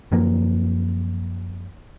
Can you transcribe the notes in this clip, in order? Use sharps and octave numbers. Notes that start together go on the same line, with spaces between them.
F#2 F3 A#3